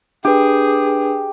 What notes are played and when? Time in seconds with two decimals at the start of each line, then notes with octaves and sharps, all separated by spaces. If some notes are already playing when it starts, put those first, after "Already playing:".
0.25 D4 G4 G#4 B4